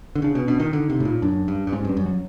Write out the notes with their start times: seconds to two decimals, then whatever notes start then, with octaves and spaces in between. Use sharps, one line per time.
0.16 D3
0.22 C#3 D4
0.35 B2 C#4
0.47 B2 D4
0.60 D#3 D#4
0.73 D3
0.90 C3
1.00 A2
1.05 A#2
1.22 F#2 D4
1.48 G2
1.67 G2
1.72 G#2 C#4
1.84 G2 G3
1.97 F#2
2.06 F#3